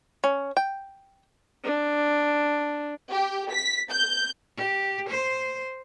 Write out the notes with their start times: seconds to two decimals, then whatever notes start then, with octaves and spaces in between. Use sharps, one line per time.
0.24 C#4
0.57 G5
1.64 D4
3.11 G4
3.52 B6
3.90 G6
4.57 G4
5.09 C5